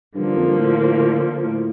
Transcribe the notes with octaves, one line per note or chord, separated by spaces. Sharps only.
G2 D3 F3 A#3
G2
F2
G2
A2
A2